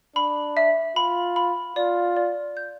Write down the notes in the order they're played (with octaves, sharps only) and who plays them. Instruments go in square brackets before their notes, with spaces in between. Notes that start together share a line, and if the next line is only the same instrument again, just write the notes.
[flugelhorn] D4 [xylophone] B5
[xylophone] E5
[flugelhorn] F4 [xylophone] B5
[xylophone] B5
[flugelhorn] F4 [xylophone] D5
[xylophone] D5
G6